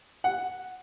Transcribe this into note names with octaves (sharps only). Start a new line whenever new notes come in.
F#5